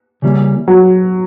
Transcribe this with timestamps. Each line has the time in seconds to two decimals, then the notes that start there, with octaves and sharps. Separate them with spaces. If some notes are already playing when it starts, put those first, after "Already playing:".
0.22 C#3 E3 G3 A#3
0.68 F#3